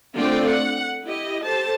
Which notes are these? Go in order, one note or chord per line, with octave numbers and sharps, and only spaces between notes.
D3 A3 C4 F4 D5 G5
F#5
E4 G4 D#5
G4 A4 C5 A5